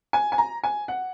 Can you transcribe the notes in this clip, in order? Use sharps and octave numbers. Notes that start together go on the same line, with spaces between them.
G#5
G#5
A#5
G#5
F#5